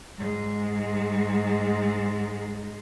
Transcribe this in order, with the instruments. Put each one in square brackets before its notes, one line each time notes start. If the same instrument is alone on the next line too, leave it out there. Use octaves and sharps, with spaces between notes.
[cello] G#2 G#3